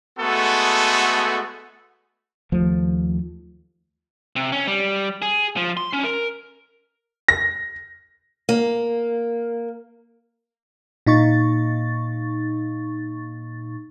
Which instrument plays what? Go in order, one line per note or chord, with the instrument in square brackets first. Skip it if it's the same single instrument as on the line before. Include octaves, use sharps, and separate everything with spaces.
[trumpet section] G#3 A3 B3 F#4 A4
[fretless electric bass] D#2 F3 A3
[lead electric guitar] C3
C#4
G3
G#4
F3
C6
C#4
A#4
[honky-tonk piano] A#6
[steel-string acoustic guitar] A#3
[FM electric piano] A#2 D#4 C#6 A6